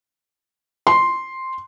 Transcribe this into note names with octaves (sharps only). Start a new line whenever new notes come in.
C6